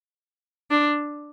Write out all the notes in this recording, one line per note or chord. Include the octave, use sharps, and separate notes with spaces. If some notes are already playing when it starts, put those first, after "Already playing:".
D4